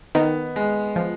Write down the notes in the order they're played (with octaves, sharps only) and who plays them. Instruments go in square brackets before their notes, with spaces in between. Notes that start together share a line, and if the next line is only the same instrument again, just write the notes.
[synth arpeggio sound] D#3 [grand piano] B3
[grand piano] G#3
[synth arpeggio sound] F3